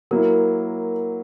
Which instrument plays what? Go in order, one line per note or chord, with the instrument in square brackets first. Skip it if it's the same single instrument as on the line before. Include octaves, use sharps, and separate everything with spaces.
[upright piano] F#3 A#3 E4 [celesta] A#4